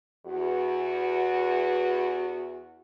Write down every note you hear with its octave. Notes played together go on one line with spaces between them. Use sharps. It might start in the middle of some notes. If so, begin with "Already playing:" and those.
E2 F#4